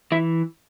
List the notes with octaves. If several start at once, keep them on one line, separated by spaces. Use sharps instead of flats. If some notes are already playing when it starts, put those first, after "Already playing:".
E3 E4